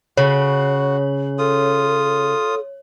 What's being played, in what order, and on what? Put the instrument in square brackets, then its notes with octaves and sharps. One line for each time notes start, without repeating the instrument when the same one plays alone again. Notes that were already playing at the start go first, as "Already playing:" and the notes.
[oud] C#3 [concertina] F#4 [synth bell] C#5
[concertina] F4 D#6 [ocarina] A4